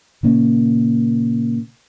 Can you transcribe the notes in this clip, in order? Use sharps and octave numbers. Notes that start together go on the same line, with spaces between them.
A#2 C#3 A#3 C#4